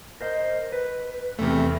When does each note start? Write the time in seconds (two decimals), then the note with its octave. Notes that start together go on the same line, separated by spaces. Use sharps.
0.21 A#4 C5 D#5
0.72 B4
1.39 E2 C3 A3